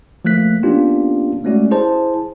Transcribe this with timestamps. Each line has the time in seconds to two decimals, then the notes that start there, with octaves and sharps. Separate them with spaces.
0.25 F3 A3 A#3 F#6 B6
0.63 A#3 B3 C#4 D4 F4 G4
1.44 G#3 A3 C#4 F#4 D5
1.71 E4 G#4 C5 A5